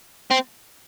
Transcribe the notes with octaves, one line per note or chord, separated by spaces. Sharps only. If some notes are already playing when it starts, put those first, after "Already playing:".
C4